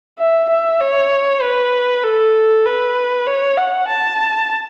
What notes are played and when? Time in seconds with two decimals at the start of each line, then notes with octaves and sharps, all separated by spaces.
0.19 E5
0.49 E5
0.80 C#5
1.42 B4
2.03 A4
2.65 B4
3.27 C#5
3.57 F#5
3.88 A5